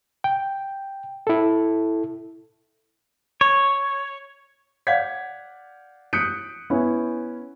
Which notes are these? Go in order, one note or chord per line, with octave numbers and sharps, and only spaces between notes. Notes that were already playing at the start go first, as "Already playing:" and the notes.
G5
E4 A4
C#5
D5 F5 F#5 G6 G#6 B6
D#6 F#6 G6 B6 C#7 D7
B3 C#4 E4